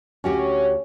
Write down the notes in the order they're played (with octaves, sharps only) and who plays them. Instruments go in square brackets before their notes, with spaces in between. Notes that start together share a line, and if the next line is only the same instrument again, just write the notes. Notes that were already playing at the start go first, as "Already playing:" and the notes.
[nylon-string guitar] D2 F#4 G4 [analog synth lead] C#4